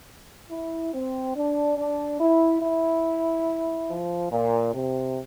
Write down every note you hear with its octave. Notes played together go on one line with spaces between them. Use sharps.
E4
C4
D4
D4
E4
E4
F3
A#2
C3